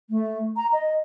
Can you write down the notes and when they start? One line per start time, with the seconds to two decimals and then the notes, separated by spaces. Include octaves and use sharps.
0.10 A3
0.56 A#5
0.73 D#5